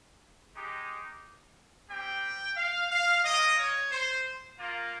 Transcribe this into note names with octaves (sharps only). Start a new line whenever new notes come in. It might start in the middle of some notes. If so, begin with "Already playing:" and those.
G#3 D#4 G4
G3 C4 G4 G5
F5
F5
A#3 F4 D#5
C#5
C5
A#3 F4